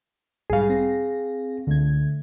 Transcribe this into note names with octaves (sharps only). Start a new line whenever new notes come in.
B1 G#2 G3 G#4 F5
C4 A#6
C#2 D3 A3 G#6